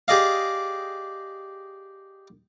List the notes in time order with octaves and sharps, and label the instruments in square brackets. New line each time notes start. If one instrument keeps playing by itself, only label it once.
[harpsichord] G4 G#4 D5 D#5 F5